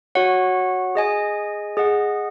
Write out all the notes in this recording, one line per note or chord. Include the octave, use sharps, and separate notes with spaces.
F#4 C#5 F#5
G#4 D#5 G#5
G#4 D#5 F#5